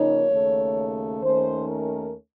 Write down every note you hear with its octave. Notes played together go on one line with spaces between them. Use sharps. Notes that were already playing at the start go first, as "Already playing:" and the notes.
Already playing: C#3 F3 A#3 D#4 C#5
D#2 C#3 A3
D#2 D#3 A3 C#4 C5
A#4